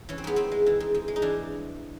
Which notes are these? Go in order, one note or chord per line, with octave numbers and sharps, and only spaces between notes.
E3 C#4
C4
G#2 B3
G#2 C4
G#3
E3
G#2
G#2
G#3
D#4
E3 D4